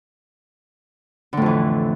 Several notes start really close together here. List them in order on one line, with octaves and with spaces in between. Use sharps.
D3 A2 F2 E3